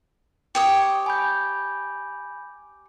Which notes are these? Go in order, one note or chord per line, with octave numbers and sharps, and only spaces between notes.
G4 C#5 D#6
G#5 B5 G6